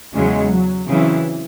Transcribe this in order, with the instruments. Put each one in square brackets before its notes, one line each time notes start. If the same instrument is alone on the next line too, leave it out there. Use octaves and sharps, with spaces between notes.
[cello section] E2 C#3 F#3 C#4 [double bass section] G#3
[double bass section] F#3
[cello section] C#3 F#3 C4 E4 [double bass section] E3